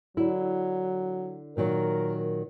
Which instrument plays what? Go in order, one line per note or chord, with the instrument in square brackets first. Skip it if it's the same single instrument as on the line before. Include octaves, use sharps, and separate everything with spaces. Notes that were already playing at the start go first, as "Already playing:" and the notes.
[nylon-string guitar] D3 E4 [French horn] F#3
[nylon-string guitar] A#2 D#3 F#3 [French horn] A#4